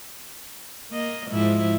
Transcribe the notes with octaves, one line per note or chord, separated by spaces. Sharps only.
A#3 D#5
G#2 F3 E4